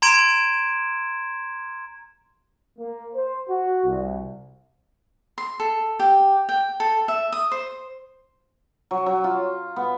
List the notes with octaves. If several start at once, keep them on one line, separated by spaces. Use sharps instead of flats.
A#5 C6 G#6 D7 E7
A#3
C5
F#4
C2
C6
A4
G4
G5
A4
E5
D#6
C5
F#3
F#3
F4
B3